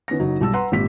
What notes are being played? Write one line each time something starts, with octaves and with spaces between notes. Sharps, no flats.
D#3 B3 C#4 A#6
F#1 F#3 D#4
B1 G3 A5 E6
B4 F#5 A#5 C6
G#1 A#2 G4 B6